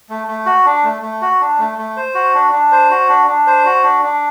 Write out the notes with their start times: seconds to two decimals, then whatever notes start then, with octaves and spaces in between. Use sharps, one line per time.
0.09 A3
0.28 A3
0.46 F#4
0.66 D4
0.84 A3
1.02 A3
1.22 F#4
1.41 D4
1.59 A3
1.78 A3
1.97 C5
2.15 F#4
2.34 D4
2.53 D4
2.72 C5
2.91 F#4
3.09 D4
3.27 D4
3.47 C5
3.65 F#4
3.84 D4
4.03 D4